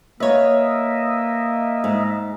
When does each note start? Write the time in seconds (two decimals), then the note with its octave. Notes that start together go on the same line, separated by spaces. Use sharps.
0.20 A#3 B4 C#5 D#5 E5
1.84 G#2